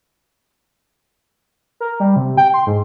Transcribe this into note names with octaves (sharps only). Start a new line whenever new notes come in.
A#4
G3
C3
G5
C6
G#2